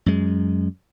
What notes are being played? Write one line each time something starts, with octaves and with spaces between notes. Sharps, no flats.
F#2 G#3